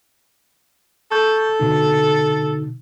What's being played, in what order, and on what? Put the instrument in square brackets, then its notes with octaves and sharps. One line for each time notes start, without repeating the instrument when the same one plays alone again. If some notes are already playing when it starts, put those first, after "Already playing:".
[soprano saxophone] A4 [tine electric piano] C#6 G6
[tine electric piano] B2 D3 D#4